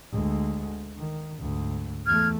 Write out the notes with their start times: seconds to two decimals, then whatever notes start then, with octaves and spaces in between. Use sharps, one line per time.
0.12 D2 G#3
0.97 D#3
1.39 D2 G#2
2.07 E2 A3 F6 G#6